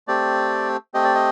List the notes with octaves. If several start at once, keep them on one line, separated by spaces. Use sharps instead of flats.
A3 C4 G4 D5
A3 C4 G4 D#5
D5
D#5